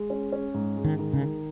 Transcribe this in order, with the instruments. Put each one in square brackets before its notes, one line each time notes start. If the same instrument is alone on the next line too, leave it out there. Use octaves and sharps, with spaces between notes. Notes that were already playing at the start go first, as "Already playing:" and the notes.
Already playing: [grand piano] G#3
C#4
C#4
G#2
G#3
[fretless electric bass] D#3
[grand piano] D#3
[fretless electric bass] C#3
[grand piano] D#3